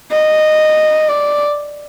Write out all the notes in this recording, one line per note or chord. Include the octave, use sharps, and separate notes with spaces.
D#5
D5